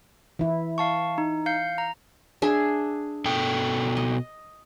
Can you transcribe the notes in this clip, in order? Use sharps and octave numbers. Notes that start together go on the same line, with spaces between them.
E3 E4
F5 A5 C#6
D#4
F5 G6 C#7
A#5
D4 G#4 E5
B2 A4 G5
D#5